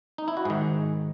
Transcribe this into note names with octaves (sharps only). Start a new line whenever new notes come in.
D#4
E4
F#4
G#2 D#3 G#4